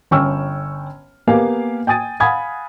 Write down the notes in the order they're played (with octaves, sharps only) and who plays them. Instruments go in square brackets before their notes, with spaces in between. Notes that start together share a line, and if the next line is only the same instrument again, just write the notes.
[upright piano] G1 C#4 G5 C#6 E6 F6
A#3 B3 G4 F5 G#5
G5 G#5 D#6 A6 D#7
F5 F#5 G#5 B5 D#6 G#6